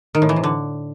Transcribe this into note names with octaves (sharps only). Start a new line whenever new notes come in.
D#3
A2
E3
C3
D3